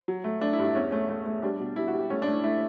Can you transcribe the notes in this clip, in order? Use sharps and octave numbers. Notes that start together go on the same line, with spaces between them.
F#3
A3
A3 D4
E4
G2
E4
E2 C#4
A3 C#4
A3
A3
G3 D4
B2
G3 E4
F#4
G3
G4
A3 C#4
D4
A3
E4
A3 E4